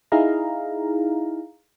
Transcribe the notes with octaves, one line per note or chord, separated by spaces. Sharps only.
D#4 E4 G#4 F5 A#5